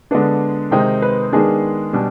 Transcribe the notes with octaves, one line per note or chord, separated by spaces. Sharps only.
D3 G#3 B3 D4
C3 D#3 G#3 C4 D#4 G5
B4
D#3 G#3 B3 D4 G#4
B2 G3 D4